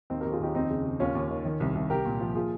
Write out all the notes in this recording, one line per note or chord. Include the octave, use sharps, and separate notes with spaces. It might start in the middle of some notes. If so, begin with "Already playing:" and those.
D#2 C4 D#4
D#2 G4 A#4
F4 G#4
D#2 D#4 G4
F2 C4 D#4
C#3
C#3
D#2 C#4 F4
D#2
D#3
D#3
C2
C2
C2 G4 A#4
A#2
F3
A#2 F4 G#4